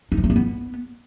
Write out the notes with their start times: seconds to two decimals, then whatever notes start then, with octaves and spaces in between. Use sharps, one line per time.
0.12 D#4
0.18 E3
0.24 A3
0.30 A#3
0.36 B3